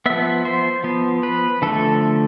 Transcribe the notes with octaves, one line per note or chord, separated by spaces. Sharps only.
F3 B3 E5
C5
F3 B3
B4
D3 F3 A3 A4